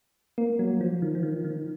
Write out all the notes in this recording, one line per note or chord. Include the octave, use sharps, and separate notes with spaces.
A#3
F#3
F3
D#3
F3
D#3
D#3